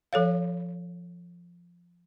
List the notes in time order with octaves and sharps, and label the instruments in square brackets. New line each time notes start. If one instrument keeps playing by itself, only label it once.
[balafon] F3 A4 C#5 F5